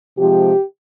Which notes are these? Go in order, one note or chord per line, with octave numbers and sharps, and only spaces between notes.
C3 F3 G#3 G4